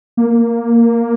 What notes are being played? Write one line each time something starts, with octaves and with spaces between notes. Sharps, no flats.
A#3